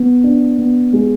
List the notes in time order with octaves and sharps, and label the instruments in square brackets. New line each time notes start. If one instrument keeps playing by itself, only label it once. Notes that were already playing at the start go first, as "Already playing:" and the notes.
Already playing: [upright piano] B3
D4
B3
G#3